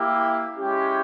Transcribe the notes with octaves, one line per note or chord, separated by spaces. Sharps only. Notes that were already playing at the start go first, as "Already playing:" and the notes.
Already playing: A#3 E4 G4
G#3 C#4 E4 G4